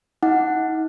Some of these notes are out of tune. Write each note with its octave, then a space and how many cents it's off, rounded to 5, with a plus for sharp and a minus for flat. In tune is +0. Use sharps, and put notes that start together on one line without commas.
D#4 +40 F#5 +0 D6 +0